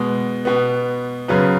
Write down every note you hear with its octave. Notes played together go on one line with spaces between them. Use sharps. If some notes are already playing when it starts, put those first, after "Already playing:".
Already playing: B2 G#3 B3
B2 B3
F#2 C#3 F#3 B3 B4